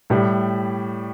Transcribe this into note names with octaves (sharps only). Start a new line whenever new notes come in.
A2 G3